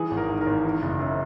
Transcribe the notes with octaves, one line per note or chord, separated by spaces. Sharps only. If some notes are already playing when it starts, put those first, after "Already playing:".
Already playing: E3 G#4
G#1
A#4
G#2
A#4
G#1
E3
F#1
F#2